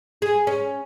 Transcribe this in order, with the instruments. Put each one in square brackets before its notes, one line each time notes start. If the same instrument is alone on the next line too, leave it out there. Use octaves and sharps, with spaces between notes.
[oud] G#4
C#4